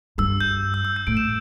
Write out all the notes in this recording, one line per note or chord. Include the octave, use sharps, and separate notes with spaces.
G2 E6
G6
E6
E6
G6
A2 D7
E7